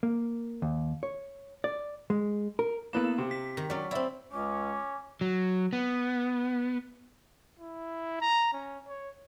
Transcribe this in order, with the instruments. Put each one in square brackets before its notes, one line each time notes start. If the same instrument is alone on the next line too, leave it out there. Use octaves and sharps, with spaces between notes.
[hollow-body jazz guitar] A#3
D#2
C#5
D5
G#3
A#4
[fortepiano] A#3 B4 [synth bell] B3 E4 E7
[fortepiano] C3
[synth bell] B6
[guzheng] D#3
[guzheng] F#3 C#4 [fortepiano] D4 D5
[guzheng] C4 E4 [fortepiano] D5 E5
[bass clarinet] C#2 [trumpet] C#4 [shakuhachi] D6
[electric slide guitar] F#3
B3
[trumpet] E4
A#5
C#4
C#5